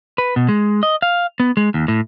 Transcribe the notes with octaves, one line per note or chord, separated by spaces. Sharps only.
B4
B2
G#3
D#5
F5
B3
G#3
D#2
A2